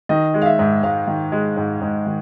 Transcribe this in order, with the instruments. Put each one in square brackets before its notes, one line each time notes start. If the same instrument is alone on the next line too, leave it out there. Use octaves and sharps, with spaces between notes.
[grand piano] D#3 [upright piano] D#5
[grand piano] G#3
[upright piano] F5
E5
[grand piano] G#2
[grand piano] G#2 [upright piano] F5
[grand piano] D#3
G#3
G#2
G#2
D#3